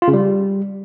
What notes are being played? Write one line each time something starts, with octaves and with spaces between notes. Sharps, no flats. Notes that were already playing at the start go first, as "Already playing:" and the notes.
F4
C#3
G3